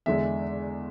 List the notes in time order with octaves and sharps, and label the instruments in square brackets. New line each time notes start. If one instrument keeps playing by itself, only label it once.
[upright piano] E2 D3 G#3 E5